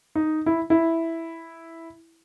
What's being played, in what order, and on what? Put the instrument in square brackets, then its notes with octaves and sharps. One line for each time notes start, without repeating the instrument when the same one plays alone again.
[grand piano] D#4
E4
E4